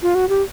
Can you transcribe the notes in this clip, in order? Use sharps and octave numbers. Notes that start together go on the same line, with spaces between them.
F4
F#4
G4